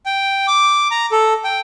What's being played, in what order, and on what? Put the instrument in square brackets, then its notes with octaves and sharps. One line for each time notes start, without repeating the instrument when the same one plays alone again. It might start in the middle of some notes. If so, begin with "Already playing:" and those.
[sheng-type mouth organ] G5
D6
A#5
A4
G5